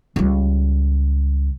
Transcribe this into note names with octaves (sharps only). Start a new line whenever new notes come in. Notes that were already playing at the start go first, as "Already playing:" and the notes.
C#2 G3